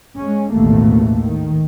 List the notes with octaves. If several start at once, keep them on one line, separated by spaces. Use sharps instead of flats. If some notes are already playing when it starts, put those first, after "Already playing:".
G#3 C#4
A1 D#2 G#2 B2 A3 A#3
D#3